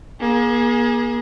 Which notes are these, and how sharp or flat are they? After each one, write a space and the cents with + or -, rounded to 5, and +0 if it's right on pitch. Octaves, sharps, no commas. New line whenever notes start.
A#3 +40 G#4 +0